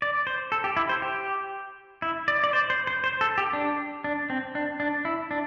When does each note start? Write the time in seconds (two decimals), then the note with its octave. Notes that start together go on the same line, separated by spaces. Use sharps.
0.02 D5
0.27 C5
0.52 A4
0.64 G4
0.77 E4
0.89 C5
1.02 G4
2.02 E4
2.28 D5
2.44 D5
2.53 C5
2.70 C5
2.87 C5
3.04 C5
3.21 A4
3.38 G4
3.53 D4
4.04 D4
4.30 C4
4.55 D4
4.80 D4
5.05 E4
5.31 D4